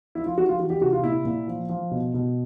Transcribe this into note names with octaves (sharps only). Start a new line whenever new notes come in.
F3 E4
F4
F3 F#4
F4
E3 F#4
G4
C3 F#4
F4
A#2 E4
A#2
F3
F3
B2
B2